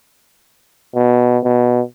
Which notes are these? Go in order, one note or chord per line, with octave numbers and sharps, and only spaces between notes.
B2
B2